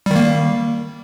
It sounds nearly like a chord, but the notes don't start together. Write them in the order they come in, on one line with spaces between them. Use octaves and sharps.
G3 D#3 A#3